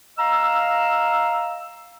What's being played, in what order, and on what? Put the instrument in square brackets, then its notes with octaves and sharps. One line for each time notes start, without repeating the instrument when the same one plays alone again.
[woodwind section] D#5 F5 A#5 E6